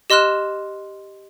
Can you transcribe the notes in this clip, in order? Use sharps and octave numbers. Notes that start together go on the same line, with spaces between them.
G4 D#5 C6 F6 F#6 E7